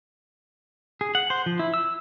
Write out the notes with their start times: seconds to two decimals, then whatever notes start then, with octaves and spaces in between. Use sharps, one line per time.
1.01 G#4
1.15 F#5
1.30 C5
1.46 F3
1.59 E4
1.74 E6